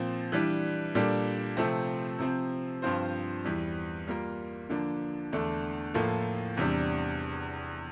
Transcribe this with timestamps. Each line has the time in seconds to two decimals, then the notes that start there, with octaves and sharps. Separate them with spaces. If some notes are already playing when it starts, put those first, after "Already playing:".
Already playing: A#2 F3 C4
0.32 E3 G3 D4
0.95 A#2 G3 D4 A4
1.57 C3 F3 A3 C4
2.19 C3 F3 C4
2.82 G2 F3 C4 F4 C5
3.45 E2 E3 G3
4.07 G3 A#3 F4 A#4
4.70 D3 F3 A#3 D4
5.32 E2 D3 A3 D4 A4
5.94 A2 F3 A#3 F4 A4
6.57 E2 C3 G3 D4